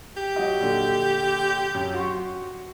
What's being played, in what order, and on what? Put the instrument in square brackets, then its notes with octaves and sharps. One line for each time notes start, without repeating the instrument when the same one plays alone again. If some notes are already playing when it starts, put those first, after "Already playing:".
[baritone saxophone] G4
[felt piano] F#3 F#4 D#5
A#1 D3
F#2
F#4 C6 C#6